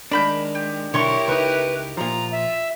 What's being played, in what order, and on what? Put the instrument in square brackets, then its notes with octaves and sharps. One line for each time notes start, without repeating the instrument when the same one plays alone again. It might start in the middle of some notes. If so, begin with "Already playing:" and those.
[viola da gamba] D#3 G#3 [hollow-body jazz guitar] D4 [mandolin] A#4 B5 G6
[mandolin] G4
[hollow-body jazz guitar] B1 D3 [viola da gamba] E4 G4 A#4 [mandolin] C#5 C6 C#6
[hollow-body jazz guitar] C#2 D#4 [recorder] B4 [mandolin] C#6
[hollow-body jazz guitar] A#2 F3 [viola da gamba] F4 [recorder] A#5
[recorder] E5